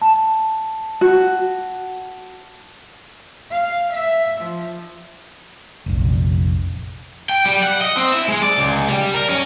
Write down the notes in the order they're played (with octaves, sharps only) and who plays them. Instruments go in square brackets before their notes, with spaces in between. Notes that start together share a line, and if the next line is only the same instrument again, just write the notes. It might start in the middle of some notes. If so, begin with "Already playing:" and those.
[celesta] A5
[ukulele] F#4
[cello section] F5
E5
F3
[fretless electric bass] F1 A#1
[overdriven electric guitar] G5
G3
F#5
D#5
C4
E4
G#3
D5
C#2
G3
A#4
C#4